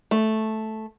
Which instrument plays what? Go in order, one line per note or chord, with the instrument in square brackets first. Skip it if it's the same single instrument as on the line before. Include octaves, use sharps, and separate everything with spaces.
[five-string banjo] A3